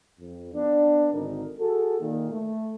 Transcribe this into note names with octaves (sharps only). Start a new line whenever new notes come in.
F2
B3 D4
G#1 G#2 D3 D#4 A#4
F#4 G#4 A4
A#2 D#3
A3